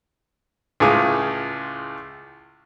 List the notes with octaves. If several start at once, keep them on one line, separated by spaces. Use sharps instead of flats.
C#2 A2 F4 G#4 D6